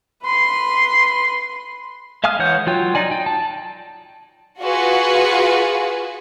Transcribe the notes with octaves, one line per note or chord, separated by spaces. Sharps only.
B4 C6
E5 F5 G#5 D#6 F6
E3 G#3 C#5 F#5 G6
F#3 F4 G5
D#4 D5 G#5
G5
A5
F4 F#4 G#4 B4